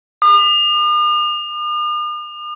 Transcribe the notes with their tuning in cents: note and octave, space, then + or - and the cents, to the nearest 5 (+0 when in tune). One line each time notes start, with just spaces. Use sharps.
D#6 -45